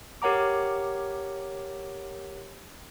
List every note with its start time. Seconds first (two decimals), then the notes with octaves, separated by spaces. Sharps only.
0.22 G4 A#4 C#5 F#5 A#5 D6